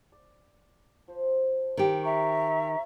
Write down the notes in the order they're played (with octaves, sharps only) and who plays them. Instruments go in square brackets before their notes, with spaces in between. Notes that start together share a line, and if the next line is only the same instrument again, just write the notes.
[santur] D5
F3 C5
[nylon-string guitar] D#3 G4
[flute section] E5 A#5 C#6